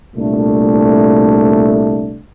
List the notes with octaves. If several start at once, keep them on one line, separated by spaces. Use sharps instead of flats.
C2 A#2 A3 D4